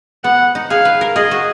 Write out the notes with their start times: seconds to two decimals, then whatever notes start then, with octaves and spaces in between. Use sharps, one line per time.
0.24 B3 F#5
0.55 D#4
0.70 G#4 F5
0.85 B4
1.01 A#4
1.16 G#4 D#5
1.31 F#4